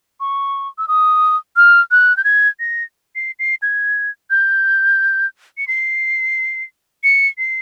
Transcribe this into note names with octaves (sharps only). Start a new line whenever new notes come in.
C#6
E6
D#6
F6
F#6
G6
G#6
A#6
C7
C7
G#6
G6
C#7
C7
C#7
C7